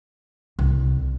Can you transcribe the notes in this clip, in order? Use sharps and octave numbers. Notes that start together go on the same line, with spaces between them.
C2